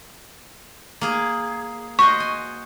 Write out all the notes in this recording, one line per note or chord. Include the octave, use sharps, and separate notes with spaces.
A#3 G#4
F#4 C5 D#5 C#6
G#5